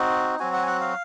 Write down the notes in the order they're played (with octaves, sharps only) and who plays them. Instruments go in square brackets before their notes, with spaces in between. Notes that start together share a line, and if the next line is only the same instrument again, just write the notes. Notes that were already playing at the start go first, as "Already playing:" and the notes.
Already playing: [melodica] C4 D#4 F#4
F#3 C4 F#4 G#5
F#5
G#5
F#5
F5